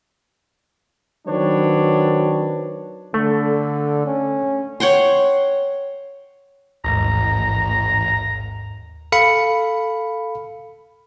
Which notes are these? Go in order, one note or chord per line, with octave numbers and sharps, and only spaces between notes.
D#3 F#3 C4 D4 B4 C#5
D3 A3
C#4
C#5 F#5 G5 C6
A1 D#2 G#2 A#5
A4 F5 B5 C#7